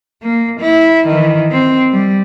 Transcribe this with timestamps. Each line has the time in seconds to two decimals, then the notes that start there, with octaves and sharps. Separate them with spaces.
0.23 A#3
0.60 E4
1.07 D#3 E3
1.51 C4
1.93 G3